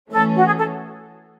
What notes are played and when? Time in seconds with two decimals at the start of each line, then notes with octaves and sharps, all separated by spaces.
0.11 E3 A3 C#4 A4
0.36 F#4
0.46 G#4
0.57 A4